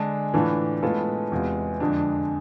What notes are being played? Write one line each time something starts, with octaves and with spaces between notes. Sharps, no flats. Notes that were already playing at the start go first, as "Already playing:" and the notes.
Already playing: D3 G#3 D4
A2 E3 A3 D4 F4
A2 G#3 B3 F4 A4
E2 C3 G#3 B3 F4
F2 D3 F3 G#3 D4